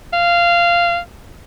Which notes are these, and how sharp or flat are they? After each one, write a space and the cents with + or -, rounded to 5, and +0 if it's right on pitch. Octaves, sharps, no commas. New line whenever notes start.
F5 -15